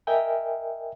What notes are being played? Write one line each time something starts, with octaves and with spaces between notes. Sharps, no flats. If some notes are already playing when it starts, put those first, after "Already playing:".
A#4 D#5 E5 G5 G#5